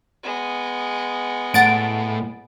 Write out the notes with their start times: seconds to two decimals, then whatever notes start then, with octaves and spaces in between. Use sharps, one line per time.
0.23 G#3 B3
1.54 A2 F#5 A6 D7